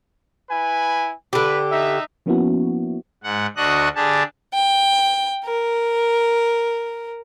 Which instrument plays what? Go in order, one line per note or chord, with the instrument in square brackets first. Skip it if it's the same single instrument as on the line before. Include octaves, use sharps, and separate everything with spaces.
[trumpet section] E4 B4 G#5
[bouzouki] D3 G4 [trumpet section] B4
[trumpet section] D#4 E5
[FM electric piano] F3 A#3 B3 C#4 E4 F#4
[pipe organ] G#2 F#5
D2 D4 F#4 D#5 F#5 F#6
D3 D4 G4 G#4 A5
[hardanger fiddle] G5
A#4